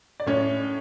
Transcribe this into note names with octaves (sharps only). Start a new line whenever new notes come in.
D5
A2 C#4 C#5